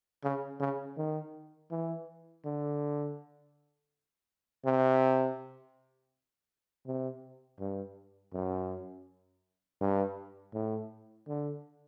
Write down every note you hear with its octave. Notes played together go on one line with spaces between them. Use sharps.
C#3
C#3
D#3
E3
D3
C3
C3
G2
F#2
G2
A2
D3